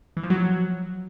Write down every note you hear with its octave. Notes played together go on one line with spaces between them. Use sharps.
E3
F3
F#3